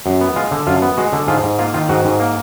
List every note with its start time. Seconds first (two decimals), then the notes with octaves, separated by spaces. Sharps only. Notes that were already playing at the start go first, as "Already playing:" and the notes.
0.06 F#2
0.21 B3
0.36 G#3 F4
0.51 D3
0.67 F#2 F4
0.82 B3
0.98 G#3 F#4
1.13 D3
1.27 G#2 F4 G#4
1.43 G#2
1.59 A#3 F4
1.74 D#3 F4
1.89 G#2 F#4
2.05 G#2
2.20 A#3